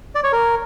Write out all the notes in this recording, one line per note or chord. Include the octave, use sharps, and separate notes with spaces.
D5
C#5
A#4